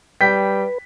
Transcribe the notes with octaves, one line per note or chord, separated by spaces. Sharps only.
G3 B4 G5 B6